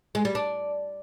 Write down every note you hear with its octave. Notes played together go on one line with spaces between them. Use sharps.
G#3
G3
D4